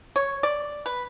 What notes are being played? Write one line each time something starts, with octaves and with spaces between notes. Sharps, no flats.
C#5
D5
B4